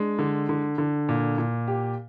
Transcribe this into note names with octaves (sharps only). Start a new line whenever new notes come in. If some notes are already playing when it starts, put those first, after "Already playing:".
Already playing: G#3 D4
D3
D3
D3
A#2
A#2
G4